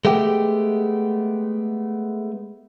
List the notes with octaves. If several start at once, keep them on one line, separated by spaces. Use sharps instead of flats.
G#3 A3 B3 G4